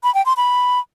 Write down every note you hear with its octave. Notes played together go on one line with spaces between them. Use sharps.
B5
G5
C6
B5